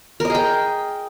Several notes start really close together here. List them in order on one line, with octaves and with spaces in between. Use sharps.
A#4 D#5 G#4 G5